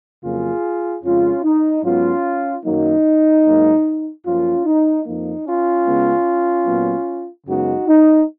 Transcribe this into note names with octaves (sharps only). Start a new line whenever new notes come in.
F2 C#3 F#3 A#3 F4 G#4
F2 C#3 G#3 C#4 F4
D#4
G#2 F#3 B3 C#4 F4
F#2 D#3 F#3 A#3 D#4
G#2 F#3 A#3
F#2 F3 A#3 C#4 F4
D#4
F2 F3 A#3 D#4
C#4 F4
C#3 G#3 B3
A#2 F#3 B3
F#2 C#3 G#3 B3 D#4 F#4
D#4